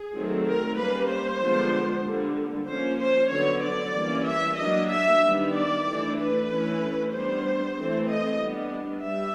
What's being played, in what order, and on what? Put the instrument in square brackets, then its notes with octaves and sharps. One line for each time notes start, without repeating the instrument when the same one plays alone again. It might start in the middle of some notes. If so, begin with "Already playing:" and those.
Already playing: [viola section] G#4
D#3 F#3 A3 C4
A#4
G3 A#3 C#4 B4
C5
D3 F3 G#3 B3 D4
D3 G3 A#3
F3 A#3 C#4 C5
C5
D3 F#3 B3 C#5
D5
E3 G3 A#3 C#4
E5
F#3 A#3 D4 D#5
E5
D#3 G3 B3 D4
D5
E3 A3 D4
B4
E3 A3 C#4
G3 B3 D4 C5
E3 A3 C4
D#5
G3 B3 D4
G3 E5